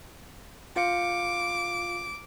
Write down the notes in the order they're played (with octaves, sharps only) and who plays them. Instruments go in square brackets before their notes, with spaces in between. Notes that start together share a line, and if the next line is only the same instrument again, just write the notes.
[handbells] F4 F5 C#7 [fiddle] D6